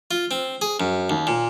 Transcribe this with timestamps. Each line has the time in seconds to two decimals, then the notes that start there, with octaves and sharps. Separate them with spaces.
0.11 F4
0.31 C4
0.62 G#4
0.80 F#2
1.10 D#2
1.27 A#2